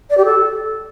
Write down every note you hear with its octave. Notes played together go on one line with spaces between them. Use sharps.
D5
G4
A4